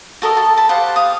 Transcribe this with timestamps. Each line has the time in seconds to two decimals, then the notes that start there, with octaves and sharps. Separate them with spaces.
0.22 F#4 A4 A#4 D#5
0.37 A4 A5
0.57 A5 B5
0.69 G4 C5 F5 F#5
0.96 F5 D#6